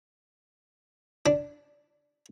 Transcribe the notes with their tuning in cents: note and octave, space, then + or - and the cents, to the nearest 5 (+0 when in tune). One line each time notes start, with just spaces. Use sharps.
D4 -5